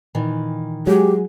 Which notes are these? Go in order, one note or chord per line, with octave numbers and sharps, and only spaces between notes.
A#2 D#3 E3
F#3 G#3 G4 G#4